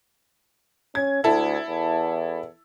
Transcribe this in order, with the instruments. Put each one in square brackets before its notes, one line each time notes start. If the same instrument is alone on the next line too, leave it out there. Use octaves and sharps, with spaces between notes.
[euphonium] C#4 [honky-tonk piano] G#6
[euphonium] D2 [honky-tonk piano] E4 A4
[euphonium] E2